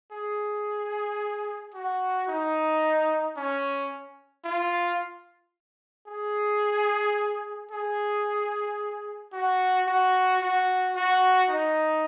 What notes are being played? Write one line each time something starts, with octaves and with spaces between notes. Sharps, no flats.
G#4
F#4
D#4
C#4
F4
G#4
G#4
F#4
F#4
F#4
F#4
D#4